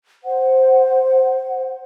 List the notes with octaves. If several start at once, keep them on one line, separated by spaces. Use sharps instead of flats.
C5 F#5